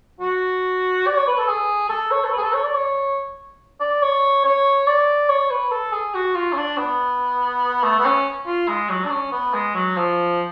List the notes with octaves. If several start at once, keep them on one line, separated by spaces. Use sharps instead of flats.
F#4
D5
C#5
B4
A4
G#4
A4
C#5
A4
B4
G#4
A4
C#5
D5
C#5
D5
C#5
C#5
D5
C#5
B4
A4
G#4
F#4
F4
C#4
D4
B3
A3
B3
C#4
F4
G#3
F#3
D4
C#4
B3
G#3
F#3
F3